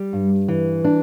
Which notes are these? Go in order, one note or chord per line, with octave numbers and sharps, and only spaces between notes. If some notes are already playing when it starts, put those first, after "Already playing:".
Already playing: G3
G2
E3
D4